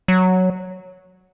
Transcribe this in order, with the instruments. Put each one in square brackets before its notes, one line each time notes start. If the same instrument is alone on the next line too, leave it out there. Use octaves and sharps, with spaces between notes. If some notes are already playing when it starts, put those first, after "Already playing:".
[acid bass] F#3